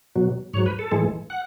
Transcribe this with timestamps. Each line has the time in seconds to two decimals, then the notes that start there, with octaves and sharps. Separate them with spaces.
0.16 B2 F#3
0.53 G#2 C#5
0.57 F#3
0.66 B4
0.79 A4
0.92 A2 E3 G#3
1.30 F#5